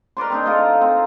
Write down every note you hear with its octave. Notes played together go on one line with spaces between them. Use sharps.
A#4 B4 D5 C6
C4 D4 D#4
F4 A4 A#4 D#5
C4